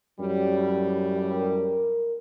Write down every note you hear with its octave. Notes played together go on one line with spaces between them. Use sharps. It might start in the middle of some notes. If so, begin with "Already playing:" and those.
F#2 A2 G3
A#4